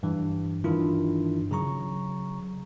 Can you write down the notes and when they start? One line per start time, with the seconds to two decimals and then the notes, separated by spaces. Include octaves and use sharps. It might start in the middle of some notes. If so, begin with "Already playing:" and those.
0.03 G2 E3
0.64 G2 D#3 E3 D4 E4 F4
1.51 C#3 F#3 A#5 C#6